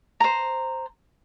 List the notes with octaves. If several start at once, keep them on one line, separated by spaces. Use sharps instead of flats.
C5 A#5